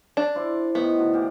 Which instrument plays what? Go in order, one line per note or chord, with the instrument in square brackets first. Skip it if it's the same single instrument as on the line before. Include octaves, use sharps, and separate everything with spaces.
[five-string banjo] D4
[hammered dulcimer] E4 C5 D5
[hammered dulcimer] A2 D#3 D#5 [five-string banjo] B3
[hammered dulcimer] D3 F#4
A#2 E3 G4